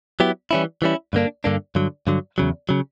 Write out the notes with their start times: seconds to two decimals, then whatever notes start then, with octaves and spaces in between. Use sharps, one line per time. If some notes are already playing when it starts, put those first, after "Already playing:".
0.20 F#3 B3 E4 G4
0.51 E3 G3 C#4 E4
0.82 E3 G3 C#4 E4
1.13 G2 D3 A#3 D4
1.44 G2 D3 A#3 D4
1.75 G2 D3 F#3
2.07 G2 D3 F#3
2.38 E2 C#3 F#3
2.69 C#3 F#3